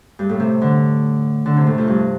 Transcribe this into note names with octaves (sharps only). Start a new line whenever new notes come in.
G2
A2
C3
D3
D3
C3
A2
F2
G2